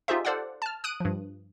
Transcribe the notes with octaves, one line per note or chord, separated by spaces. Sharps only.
D#4 F4 G4 G#4 C5 E5
A4 C5 D5 F5 F#5
A5 F6
D#6 F#6 D7 D#7
G2 F3